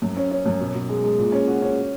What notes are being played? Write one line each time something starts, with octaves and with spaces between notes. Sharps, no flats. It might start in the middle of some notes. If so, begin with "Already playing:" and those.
F#2
C#4
C#4
F#2
B2
B2
G#3
G#3
A#2
C#4
F#4
C#4